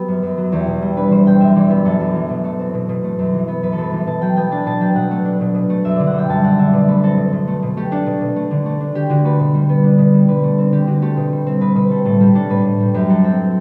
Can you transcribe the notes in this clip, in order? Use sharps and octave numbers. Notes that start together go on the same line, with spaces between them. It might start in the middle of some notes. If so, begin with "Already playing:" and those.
Already playing: F#3 B3 G4
F#2
F#2
F#3
E2 G4
B2
G3
D4 B4
E2 C5
B2 G5
F#2 E5
E3 D5
B3 G4
F#2 A4
F#2
E3
B2
A3
C4
B2
B2
A3
F#2
E3
B3
F#2 B4
A4
F#2 B4
E3
B2 A5
F#3 G5
B3 G5
D4 A5
B2 A5
F#3 G5
B2 F#5
A3
D4
B2
B2
A3
F#2 E5
D3 D5
F#5
G3 G5
F#2 A5
F#2 F#5
D3 E5
B2 D5
A3 B4
C4 A4
B2
B2
A3
B2
A3 G4
D4 A4
B2
B2
A3
D3
A3
D4
D3 G4
D3 F#4
A3 B4
B2
G3
B3
D4
B2
G3
D3 B4
A3
C4
D3 G4
D3 F#4
A3 G4
B2
G3
C4
B2 B4
B2 B4
G3 A4
A2 A4
G3 G4
D4 A4
A2 B4
A2
G3
F#2 G4
F#3 A4
C4 G5